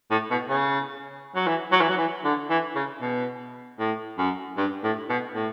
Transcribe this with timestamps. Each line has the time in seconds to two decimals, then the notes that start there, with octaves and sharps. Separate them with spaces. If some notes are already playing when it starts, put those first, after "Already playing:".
0.11 A2
0.31 B2
0.50 C#3
1.35 F#3
1.47 E3
1.72 F#3
1.81 E3
1.89 F#3
1.98 E3
2.24 D3
2.50 E3
2.75 C#3
3.01 B2
3.79 A2
4.18 F#2
4.57 G2
4.84 A2
5.10 B2
5.35 A2